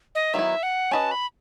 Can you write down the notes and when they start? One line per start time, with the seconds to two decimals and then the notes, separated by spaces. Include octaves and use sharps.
0.15 D#5
0.34 D#3 F#3 B3 E4 E5
0.63 F#5
0.91 C#4 F#4 B4 D#5 A5
1.11 B5